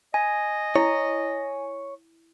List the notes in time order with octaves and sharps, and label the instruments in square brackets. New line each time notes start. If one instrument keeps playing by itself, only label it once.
[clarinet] D#5 [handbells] G#5
[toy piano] E4 [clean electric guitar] C#5